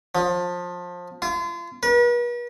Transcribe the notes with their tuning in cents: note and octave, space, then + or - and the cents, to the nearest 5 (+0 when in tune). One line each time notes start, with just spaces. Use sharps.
F3 +25
F4 -35
B4 -40